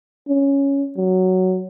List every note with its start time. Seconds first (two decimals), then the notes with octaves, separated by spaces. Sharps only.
0.28 C#4
0.97 F#3